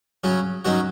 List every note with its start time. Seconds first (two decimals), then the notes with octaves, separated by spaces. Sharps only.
0.24 C#3 F#3 C#4
0.65 D#3 F#3 C#4 F#4